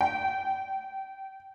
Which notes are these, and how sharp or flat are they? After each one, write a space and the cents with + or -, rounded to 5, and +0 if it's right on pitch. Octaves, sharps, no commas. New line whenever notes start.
G5 -20